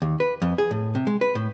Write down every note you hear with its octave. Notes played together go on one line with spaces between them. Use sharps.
D#2
B4
F2
G#4
A2
C3
G#3
B4
A2